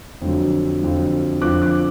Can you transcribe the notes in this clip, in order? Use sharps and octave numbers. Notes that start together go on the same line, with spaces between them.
F2 D3 F#3
F2 D3 F#3
F2 D3 F3 D6 F#6
D6 F#6